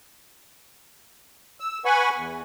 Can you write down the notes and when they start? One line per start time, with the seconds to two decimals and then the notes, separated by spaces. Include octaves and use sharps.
1.60 E6
1.85 B4 F#5 G#5 B5 C#6
2.14 E2